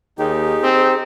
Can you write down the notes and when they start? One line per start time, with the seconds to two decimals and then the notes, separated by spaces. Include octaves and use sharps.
0.19 D#2 D#4 G4 G#4
0.63 C4